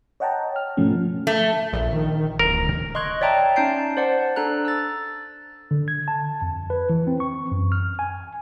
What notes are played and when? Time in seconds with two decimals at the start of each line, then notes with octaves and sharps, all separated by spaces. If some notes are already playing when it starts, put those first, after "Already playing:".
0.20 C#5 D#5 F#5 G5 A5 A#5
0.56 F6
0.77 G#2 B2 F3 A3 C#4
1.27 A3
1.73 A#1
1.93 D#3
2.39 D1 A#4
2.95 D#5 C6 C#6 F#6 G#6
3.21 C#5 D5 E5 G5 A5 A#5
3.56 C#4 D#4 A5 G6 C7 D7
3.97 C5 D5 F#5 A5
4.36 D4 A4 A#5 F#6
4.65 E6 A6
5.71 D3
5.88 G#6
6.08 A5
6.42 F2
6.70 B4
6.90 E3
7.07 C4
7.20 C#6
7.52 F#2
7.72 F6
7.99 G#5